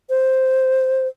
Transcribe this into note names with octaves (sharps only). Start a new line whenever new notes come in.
C5